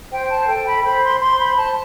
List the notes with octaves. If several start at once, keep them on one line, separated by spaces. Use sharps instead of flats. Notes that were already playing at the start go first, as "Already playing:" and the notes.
C5 G5
A5
A4 G5
B5
C5 B5
C6
C5 C6
B5
C5 A5